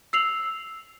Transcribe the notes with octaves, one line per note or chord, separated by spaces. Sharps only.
E6 C7 F7 F#7